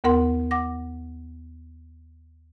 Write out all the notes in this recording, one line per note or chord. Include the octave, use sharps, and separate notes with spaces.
D#2 B3 A#4 F#5 C6
F#5 D6 A#6